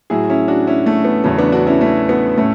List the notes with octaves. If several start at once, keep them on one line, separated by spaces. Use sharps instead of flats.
A2 F#3 E4 G#4
C#4 E4
D4 F#4
C#4 E4
A3
B3
E2 C#3 F#3 A3 C#4
B3 D4
D4 F#4
C#4 E4
A3 C#4
B3
A2 A3 C#4